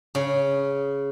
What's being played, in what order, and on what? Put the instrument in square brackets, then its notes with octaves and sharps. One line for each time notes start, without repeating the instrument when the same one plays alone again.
[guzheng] C#3